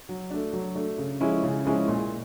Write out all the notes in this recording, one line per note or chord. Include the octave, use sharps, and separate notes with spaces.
F#3
A3 D4
F#3
A3 D4
C#3
F3 G#3 C#4 E4
C#3
F3 G#3 C#4 E4
A#2